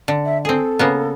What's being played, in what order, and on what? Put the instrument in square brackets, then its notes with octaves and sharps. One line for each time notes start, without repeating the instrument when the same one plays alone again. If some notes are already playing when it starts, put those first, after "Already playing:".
[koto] D3
[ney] E5
[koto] C4 G#4 [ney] A4
[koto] C#3 A#3 B3